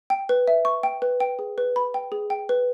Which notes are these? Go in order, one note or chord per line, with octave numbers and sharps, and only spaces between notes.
G5
B4
E5
C#6
G5
B4
G5
G#4
B4
B5
G5
G#4
G5
B4